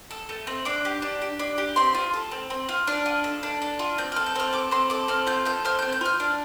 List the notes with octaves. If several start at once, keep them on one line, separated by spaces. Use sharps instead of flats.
A4
A3
C4
D4 D6
G4
D4
G4
D4
G4
C4 C6
F4
A4
C4
C4
F4
D4 F6
F4
A4
D4
D4
F4
C4 G6
F6
A4
G6
C4 F6
A4 D6
C4 C6
A4 D6
C4 F6
F4 G6
A4 G6
C4 F6
G6
C4
G6
F4 F6
D4